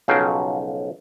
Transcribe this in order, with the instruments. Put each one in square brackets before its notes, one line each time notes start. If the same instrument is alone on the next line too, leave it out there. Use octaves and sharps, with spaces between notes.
[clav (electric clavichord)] B1 C#3 F3 F#3 C5 G5